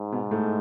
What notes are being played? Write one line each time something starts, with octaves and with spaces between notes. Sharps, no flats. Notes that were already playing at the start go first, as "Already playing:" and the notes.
Already playing: G#2
B2 B3
A2 A3